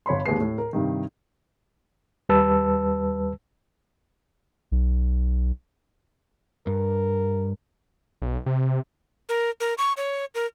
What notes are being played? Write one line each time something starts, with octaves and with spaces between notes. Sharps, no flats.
G1 C#5 B5 C6
D1 D#2 G#3 B4 C7
A2
A#4
G2 C3 D#3
D#2 G3 B4 A5 E6
B1
G2 A#4
B1
C3
A#4
A#4
C#6
C#5
A#4